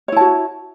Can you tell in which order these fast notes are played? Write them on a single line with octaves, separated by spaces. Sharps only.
C#5 E4 A5 F#4